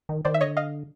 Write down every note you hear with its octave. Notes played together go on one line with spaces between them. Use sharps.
D#3
D#3 C5 D5
E5
D3 C#5 D#5
D#5 F5